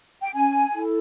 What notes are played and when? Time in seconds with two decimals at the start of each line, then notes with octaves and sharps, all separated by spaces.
0.22 G5
0.34 C#4 G#5
0.73 E4 A4